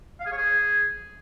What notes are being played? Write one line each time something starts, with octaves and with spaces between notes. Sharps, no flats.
F5
G#4
C#5
G#4